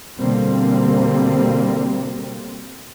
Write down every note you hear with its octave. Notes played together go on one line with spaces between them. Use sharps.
B2 D3 G3 A#3 C4